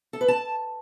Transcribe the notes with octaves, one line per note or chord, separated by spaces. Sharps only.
A4
B4
A5